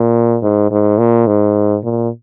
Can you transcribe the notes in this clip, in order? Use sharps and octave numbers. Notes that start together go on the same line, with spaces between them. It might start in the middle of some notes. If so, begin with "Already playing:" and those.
Already playing: A#2
G#2
G#2
A#2
G#2
A#2